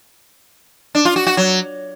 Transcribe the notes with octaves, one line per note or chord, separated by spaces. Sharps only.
D4
F4
F#4
F#4
F#3